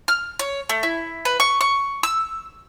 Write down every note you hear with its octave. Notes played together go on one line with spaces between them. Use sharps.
F6
C#5
A3
E4
B4
C#6
C#6
E6